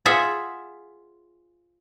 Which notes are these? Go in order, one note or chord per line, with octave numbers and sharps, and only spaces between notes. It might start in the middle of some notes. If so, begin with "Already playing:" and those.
F4 G#4 E5 F#5